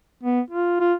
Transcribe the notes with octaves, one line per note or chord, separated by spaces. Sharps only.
B3
F4
F4